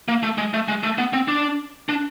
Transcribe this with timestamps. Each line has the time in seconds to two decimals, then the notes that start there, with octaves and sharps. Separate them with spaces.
0.08 A#3
0.23 A3
0.38 G#3
0.54 A3
0.68 G#3
0.83 A3
0.98 B3
1.13 C4
1.28 D4
1.89 D4